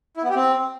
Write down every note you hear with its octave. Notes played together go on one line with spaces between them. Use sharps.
E4
B3
G4
C4